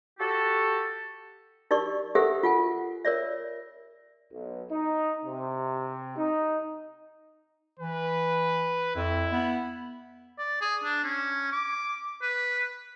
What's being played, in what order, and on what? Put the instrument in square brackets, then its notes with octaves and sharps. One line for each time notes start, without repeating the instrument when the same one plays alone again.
[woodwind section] F#4 G4 A4
[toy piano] D#4 G4 A#4 D5 C#6
G4 A4 A#4 C5 E5 F#5
F4 F#5 G#5
A#4 C#5 D5 E5
[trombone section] B1
D#4
C3
D#4
[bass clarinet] E3 [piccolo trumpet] B4
[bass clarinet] F2 [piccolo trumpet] E4
[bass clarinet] B3
[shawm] D5
G#4
D4
C#4
D6
B4